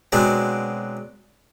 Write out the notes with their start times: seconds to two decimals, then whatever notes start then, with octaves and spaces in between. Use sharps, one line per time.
0.12 B2 F#3 G#3 C4 D4